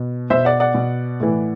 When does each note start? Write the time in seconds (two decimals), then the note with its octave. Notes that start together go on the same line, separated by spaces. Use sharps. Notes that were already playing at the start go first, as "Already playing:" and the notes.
Already playing: B2
0.30 B2 C5 E5
0.45 D5 F#5
0.60 D5 F#5
0.75 B2
1.20 A2 E3